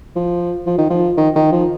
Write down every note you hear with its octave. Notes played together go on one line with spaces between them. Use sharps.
F3
F3
D#3
F3
D#3
D#3
F3